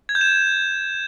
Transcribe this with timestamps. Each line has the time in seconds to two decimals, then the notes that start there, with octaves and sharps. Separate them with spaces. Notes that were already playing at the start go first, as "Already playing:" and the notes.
0.09 G#6
0.15 G6
0.21 E7